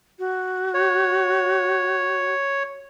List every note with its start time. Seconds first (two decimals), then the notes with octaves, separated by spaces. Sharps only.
0.19 F#4
0.74 C#5